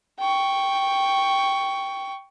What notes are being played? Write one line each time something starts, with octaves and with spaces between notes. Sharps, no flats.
G5 C#6